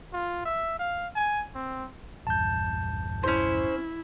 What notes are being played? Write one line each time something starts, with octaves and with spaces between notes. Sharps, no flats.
F4
E5
F5
G#5
C4
A#1 E2 G2 A5 G6
C#4 E4 C5